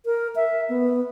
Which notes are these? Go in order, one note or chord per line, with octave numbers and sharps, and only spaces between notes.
A#4
E5
B3